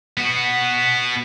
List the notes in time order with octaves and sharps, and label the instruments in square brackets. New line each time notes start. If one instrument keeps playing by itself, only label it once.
[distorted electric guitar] B3 F#4